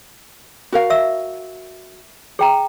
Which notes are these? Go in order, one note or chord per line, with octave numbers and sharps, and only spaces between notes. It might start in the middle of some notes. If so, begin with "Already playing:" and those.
F#4 A#4 F5
E5 E6
G#4 G5 A#5